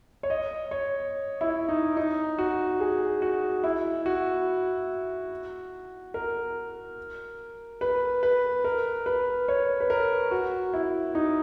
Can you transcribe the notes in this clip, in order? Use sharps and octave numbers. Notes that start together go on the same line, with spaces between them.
C#5
D#5
C#5
E4
D#4
D#4
F#4
G#4
F#4
E4
F#4
A#4
B4
B4
A#4
B4
C#5
B4
A#4
F#4
E4
D#4